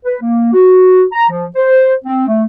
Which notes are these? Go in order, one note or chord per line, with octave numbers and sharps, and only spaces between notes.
B4
A#3
F#4
A#5
F3
C5
C4
A3